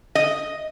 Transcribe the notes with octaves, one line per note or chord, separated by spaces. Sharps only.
D#5